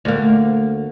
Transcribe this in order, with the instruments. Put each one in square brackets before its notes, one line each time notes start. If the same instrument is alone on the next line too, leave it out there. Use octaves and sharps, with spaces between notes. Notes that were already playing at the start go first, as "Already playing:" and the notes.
[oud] D2 A#3